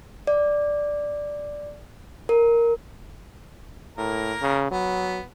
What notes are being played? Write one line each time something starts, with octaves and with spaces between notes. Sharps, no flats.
D5
A#4
A2 A#3 A#4
C#3
F#3 B3